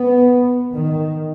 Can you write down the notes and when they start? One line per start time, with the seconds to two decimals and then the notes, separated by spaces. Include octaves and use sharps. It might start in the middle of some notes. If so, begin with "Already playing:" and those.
Already playing: B3
0.73 D#3